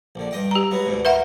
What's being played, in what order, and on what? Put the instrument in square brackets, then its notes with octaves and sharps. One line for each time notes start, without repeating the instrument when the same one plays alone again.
[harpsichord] A#1 D3
G2 D#5 G5
[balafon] G4 A#5
[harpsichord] F#3 G#3 B3
D2 G#2 B2
[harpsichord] A#4 [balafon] B4 E5 F#5